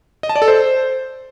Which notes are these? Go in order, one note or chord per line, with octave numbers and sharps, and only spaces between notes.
D#5
A5
D5
A4
C5